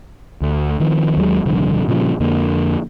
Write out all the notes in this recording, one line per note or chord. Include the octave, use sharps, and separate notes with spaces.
D2
D#3 F3 A#3 C4
D#2 F#3 G#3
D#1 C2 D3 F3
A#2 C#3 F3 G3
F2 D3 A#3